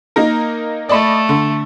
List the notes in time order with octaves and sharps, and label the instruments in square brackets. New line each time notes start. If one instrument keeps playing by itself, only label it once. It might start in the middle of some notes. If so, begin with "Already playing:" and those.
[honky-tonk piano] A#3 D#4 A#4
[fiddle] A3 [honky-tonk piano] D5 D#5 B5
[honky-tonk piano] D3